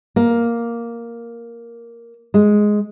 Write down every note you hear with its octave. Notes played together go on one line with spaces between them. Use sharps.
A#3
G#3